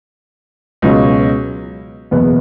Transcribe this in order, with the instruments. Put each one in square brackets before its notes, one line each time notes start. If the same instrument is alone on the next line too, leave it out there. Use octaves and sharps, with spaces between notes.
[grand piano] C#2 B2 F#3 C#4
F#1 E2 B2 B3